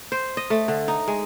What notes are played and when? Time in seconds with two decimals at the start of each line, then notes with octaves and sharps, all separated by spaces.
0.12 C5
0.37 D#5
0.50 A3
0.68 D3
0.88 D#4
1.08 G#3